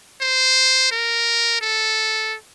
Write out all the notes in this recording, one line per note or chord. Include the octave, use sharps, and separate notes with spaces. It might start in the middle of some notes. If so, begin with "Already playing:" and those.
C5
A#4
A4